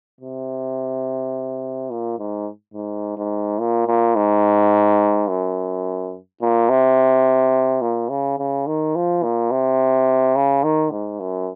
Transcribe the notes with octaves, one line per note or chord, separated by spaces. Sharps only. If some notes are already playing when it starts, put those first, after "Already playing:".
C3
A#2
G#2
G#2
G#2
A#2
A#2
G#2
F#2
A#2
C3
A#2
C#3
C#3
D#3
F3
A#2
C3
C#3
D#3
G#2
F#2